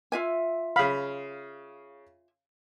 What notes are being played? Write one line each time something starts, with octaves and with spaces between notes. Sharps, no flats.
F4 E5 G#5
C#3 F5 B5